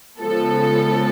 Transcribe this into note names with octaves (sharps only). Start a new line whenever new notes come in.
C#3 F3 G#3 B3 A4